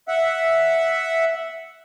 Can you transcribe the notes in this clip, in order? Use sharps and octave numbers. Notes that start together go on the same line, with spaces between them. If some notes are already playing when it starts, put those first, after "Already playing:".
E5 F#5